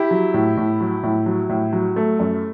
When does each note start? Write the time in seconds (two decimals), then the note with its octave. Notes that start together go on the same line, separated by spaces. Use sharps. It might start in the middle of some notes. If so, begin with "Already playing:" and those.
Already playing: E4 G4
0.11 F#3
0.34 A2
0.57 A2
0.81 F#3
1.03 A2
1.26 F#3
1.49 A2
1.73 F#3
1.96 A3
2.19 F#2